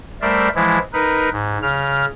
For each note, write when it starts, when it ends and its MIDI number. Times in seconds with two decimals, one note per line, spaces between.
0.22 0.48 55
0.22 0.48 57
0.22 0.48 70
0.22 0.48 72
0.22 0.48 74
0.22 0.48 76
0.55 0.78 52
0.55 0.78 53
0.55 0.78 56
0.55 0.78 64
0.93 1.29 63
0.93 1.29 70
0.93 1.29 71
1.32 1.58 44
1.62 2.05 49
1.62 2.05 89